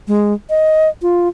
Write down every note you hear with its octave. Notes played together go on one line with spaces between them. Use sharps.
G#3
D#5
F4